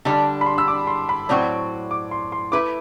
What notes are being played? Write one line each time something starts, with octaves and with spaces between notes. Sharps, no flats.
D3 G3 D4 A5
B5
C6
E6
D6
C6
B5
A2 F#3 C4 F#4 D5
D6
C6
C6
A3 E4 B4 D6